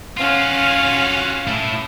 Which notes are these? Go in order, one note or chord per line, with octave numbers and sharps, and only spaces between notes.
C#4 F4 F#4 F5
A3 E4